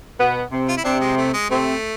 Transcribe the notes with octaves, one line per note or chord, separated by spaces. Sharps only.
B2 B3
C3 C4
F4
E4
C3 C4 D4
G#3
A3
G#3
C3 A3 C4